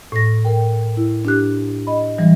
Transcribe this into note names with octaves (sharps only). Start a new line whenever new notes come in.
A2 A#6
A2 A#4 G5
E4
D4 G4 F#6
D#5 B5
E3 F#3 G3